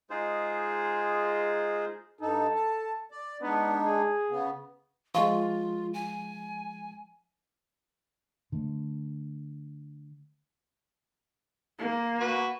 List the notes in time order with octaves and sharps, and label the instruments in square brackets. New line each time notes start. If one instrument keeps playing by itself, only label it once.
[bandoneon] G#3 D#4 F4 G#4 C5
[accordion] G2 D#4 [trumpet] A4
[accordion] A5
D5
[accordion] G#3 D4 D#4 [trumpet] B3
[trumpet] G#4
[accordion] C#3 B3
[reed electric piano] F3 G#3 [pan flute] F4 [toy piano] F5 C6 C#6
[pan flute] G#5
[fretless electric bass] D3 A3
[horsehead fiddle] A#3
[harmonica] F#4 B4